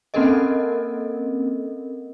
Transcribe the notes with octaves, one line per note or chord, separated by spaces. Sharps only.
A#3 C4 C#4 A4 A#4 D#5